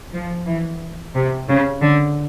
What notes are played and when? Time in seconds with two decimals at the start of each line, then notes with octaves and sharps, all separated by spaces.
0.14 F3
0.47 E3
1.15 C3
1.48 C#3
1.81 D3